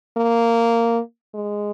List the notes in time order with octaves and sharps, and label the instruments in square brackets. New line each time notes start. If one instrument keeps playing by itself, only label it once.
[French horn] A#3
G#3